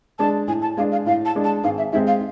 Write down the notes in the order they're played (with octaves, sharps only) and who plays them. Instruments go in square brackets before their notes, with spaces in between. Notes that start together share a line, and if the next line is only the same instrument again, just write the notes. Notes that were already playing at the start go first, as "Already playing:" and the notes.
[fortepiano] G#3 D4 [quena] A5
[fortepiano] A2 [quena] G#5
[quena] A5
[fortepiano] G#3 D4 [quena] F5
[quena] F5
[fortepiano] A2 [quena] F5
[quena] A5
[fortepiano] G#3 D4
[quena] A5
[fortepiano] G#1 [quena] F5
[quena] E5
[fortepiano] G#2 G#3 C4 [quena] E5
[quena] F5